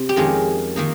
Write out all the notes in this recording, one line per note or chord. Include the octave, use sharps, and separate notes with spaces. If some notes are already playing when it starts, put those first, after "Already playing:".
Already playing: C3
G4
F2 D#3 G#3 C#4 F4
D#3 A#3 D#4